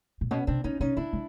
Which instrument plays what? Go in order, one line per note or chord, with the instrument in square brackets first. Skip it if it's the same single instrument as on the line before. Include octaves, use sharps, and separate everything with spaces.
[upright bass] A#2
[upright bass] B2 [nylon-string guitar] B3 C#4
[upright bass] C3 [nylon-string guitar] C4 D4
[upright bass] C#3 [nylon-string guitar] C#4 D#4
[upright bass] C3 [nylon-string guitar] C#4 D#4
[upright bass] C#3 [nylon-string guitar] D4 E4
[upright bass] C#3